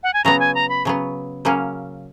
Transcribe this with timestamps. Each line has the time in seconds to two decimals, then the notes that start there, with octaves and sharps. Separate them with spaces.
0.03 F#5
0.14 G#5
0.24 C#3 F#3 B3 A#5
0.40 G#5
0.55 A#5
0.69 B5
0.85 C#3 F#3 B3
1.45 C#3 F#3 A#3 C#4